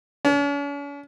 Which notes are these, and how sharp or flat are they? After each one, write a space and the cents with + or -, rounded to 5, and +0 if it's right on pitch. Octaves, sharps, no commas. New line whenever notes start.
C#4 +45